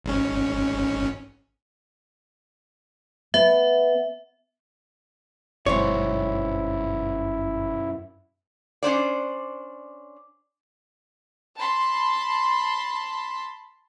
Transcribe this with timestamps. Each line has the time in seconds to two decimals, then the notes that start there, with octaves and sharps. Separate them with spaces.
0.04 G#1 G#2 C#4
3.34 B3 E5
5.66 G1 F#2 B2 G#3 C4 E4 C#5
8.83 C#4 D4 C5 D5
11.57 A5 B5 C6